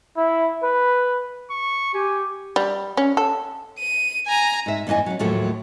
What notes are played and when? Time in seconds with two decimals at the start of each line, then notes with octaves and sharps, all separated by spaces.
0.17 E4
0.63 B4
1.51 C#6
1.94 G4 G#5
2.56 G3
2.97 C#4
3.17 A4
3.79 D#7
4.27 G#5 A#5
4.66 G#2 E5
4.87 E2 G2 E3 D#5 G#5
5.06 F#3 C#4
5.19 D#2 A2 F3 F#3 A3